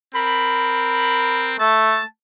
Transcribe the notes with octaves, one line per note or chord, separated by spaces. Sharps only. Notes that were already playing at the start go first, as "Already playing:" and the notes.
C4 A#4 B5
A3 A5